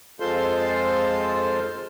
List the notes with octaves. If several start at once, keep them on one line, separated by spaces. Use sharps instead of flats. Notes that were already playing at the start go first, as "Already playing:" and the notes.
F2 G#3 F4 A4 C5 C6